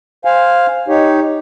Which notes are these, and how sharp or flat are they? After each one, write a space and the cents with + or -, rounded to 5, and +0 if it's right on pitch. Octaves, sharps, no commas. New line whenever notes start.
C5 +0 F5 +0 G#5 -5
D#4 +0 G4 +0 C#5 -5